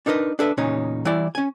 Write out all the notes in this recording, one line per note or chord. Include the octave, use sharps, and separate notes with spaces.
D4 D#4 A#4 B4 D#5
D4 A4 B4 E5
E2 A#2 C#3 C#4 D#4 C#5
E3 G3 E4 D5
C#4 G#5